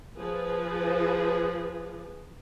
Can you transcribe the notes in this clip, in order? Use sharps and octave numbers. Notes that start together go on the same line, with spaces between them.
F3 G#4 B4